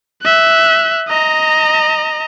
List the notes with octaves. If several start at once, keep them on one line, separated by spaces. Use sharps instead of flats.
E5 F#6
D#5 A#5